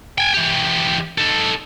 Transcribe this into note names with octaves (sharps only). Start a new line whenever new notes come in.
G5 G#5
E3 G4
D#4 A4